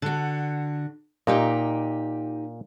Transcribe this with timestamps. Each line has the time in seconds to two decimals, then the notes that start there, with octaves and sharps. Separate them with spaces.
0.02 D3 F#4
1.27 A#2 D#4 G4 D#5 G5